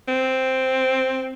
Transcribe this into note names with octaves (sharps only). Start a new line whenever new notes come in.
C4